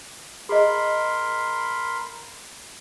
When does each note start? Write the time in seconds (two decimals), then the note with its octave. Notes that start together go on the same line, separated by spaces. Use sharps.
0.49 G#4 A#4 D#5 B5 C6